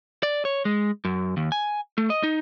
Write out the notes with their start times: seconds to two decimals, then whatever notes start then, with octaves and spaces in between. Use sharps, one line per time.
0.23 D5
0.45 C#5
0.65 G#3
1.05 F#2
1.37 D#2
1.52 G#5
1.98 A3
2.10 D#5
2.23 D#4